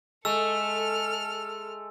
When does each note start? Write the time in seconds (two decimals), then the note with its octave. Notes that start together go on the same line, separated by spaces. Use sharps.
0.25 G#3 A3 A4 E6 F6